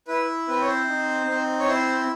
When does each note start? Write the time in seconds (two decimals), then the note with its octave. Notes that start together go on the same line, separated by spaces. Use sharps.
0.08 E4 B4
0.48 C4 B4
0.61 C#5
0.68 C5
0.88 D#4
1.29 C4
1.59 C#5
1.68 E4 C5